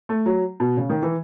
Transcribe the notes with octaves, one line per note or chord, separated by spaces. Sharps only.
A3
F#3
B2
C#3
D#3
E3